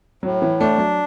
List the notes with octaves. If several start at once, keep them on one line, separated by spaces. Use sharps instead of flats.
A2 F#3
E3
A3 D4
F#3